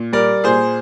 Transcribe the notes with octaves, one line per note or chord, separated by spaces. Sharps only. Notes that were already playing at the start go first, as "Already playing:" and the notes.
Already playing: A#2
G3 A#4 D5
A#2 G#4 C5